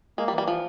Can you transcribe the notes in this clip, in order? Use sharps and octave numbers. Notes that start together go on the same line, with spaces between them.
G#3 A#3
G3
E3
G3
F3